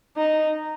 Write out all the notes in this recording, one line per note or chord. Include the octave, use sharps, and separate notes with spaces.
D#4